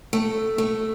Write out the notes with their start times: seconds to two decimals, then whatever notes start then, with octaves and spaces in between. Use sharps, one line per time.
0.13 A3
0.58 A3